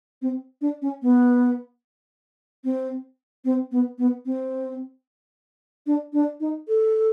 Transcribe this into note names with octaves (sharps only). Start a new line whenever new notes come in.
C4
D4
C#4
B3
C4
C4
B3
B3
C4
D4
D4
D#4
A4